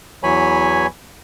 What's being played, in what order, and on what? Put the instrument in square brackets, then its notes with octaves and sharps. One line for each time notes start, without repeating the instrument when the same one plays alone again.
[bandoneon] E2 E3 F#3 C#5 G#5 B5